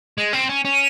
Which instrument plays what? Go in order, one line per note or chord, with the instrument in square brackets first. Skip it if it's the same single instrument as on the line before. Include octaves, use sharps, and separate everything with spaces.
[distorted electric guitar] G#3
C4
C#4
C#4